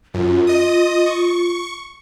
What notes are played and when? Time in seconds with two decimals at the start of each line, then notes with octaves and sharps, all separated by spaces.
0.14 F#2 F4
0.47 D#5 D#6
1.06 C#6